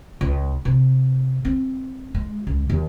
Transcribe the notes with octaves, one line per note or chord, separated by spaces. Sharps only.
C#2
C3
C4
G#3
C#2
D#2